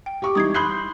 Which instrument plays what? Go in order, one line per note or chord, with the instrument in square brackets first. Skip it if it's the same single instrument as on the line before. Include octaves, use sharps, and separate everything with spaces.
[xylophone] G5
[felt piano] G4 C#6 D6
[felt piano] E3 G3 D#4 [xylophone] D#6 G#6 C7
[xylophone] B5 C6 F#6 [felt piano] D#6 G6 C7